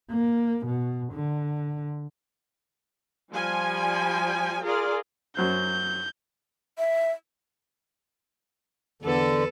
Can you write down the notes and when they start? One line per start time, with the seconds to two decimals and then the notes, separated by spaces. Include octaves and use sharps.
0.11 A#3
0.66 B2
1.13 D3
3.33 F3 G3 G#5
4.62 F4 G#4 A#4 D5
5.37 F#2 F#3 C5 G6
6.78 E5
9.03 E2 D3 A4 B4